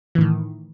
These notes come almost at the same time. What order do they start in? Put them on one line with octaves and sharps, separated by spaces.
E3 A2 D#3